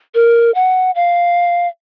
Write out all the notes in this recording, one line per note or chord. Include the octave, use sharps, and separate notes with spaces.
A#4
F#5
F5